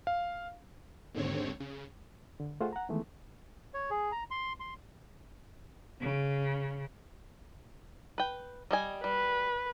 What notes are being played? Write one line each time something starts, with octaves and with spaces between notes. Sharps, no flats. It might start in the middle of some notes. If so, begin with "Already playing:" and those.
F5
D#2 G#2 D3 C4 C#5
C#3
D3
A3 F4 G#4 A4 C5 F#5
F#5 A#5
D#3 E3 G#3 A3 B3
C#5
G#4
A#5
C6
C6
C#3
B4 G5
G3 D#5 G#5
G3 B4